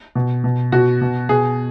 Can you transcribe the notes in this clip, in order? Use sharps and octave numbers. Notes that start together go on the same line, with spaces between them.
B2
B2
B2 F#4
B2
B2 G#4